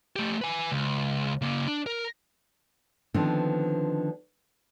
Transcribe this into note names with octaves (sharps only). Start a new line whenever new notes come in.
A3 G4
B4 G#5
C#2
C#3 A#3
D4
A#4
D3 D#3 F3 B3 C4 D4